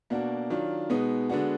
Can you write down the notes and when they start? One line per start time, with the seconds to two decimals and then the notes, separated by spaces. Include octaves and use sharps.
0.10 B2 A#3 D4 F#4
0.50 D#3 F#3 D4 F4
0.89 B2 G#3 B3 D#4
1.30 D3 G#3 B3 D4 F#4